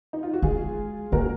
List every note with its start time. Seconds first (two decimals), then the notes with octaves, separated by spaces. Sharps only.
0.13 D#4
0.23 F4
0.33 F#4
0.42 G#3 F4 G#4
1.12 A#3 F#4 A#4